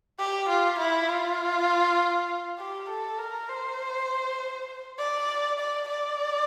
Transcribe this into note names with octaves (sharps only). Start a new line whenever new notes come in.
G4
F4
E4
F4
G4
A4
A#4
C5
D5
D5
D5